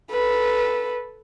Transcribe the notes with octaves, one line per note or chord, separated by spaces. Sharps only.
A4 B4